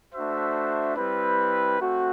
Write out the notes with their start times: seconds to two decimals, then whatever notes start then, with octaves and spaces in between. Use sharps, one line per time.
0.14 A3 D4 F#4 C5 E5
0.97 G3 C4 E4 B4
1.79 A3 C4 F#4